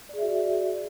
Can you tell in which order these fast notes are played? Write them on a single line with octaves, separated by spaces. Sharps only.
D5 G#4 E5 F#4